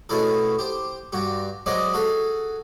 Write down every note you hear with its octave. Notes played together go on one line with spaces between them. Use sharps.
B2 A3 C#4 E4 G#4 A4
G4 C5
G2 F#4 G4
F#3 G#3 C4 G#4 D5 D#5
F#4 G#4 A4